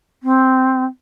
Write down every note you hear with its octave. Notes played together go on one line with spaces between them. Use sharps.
C4